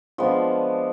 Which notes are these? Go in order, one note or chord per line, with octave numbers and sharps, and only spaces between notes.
F3 G#3 B3 D4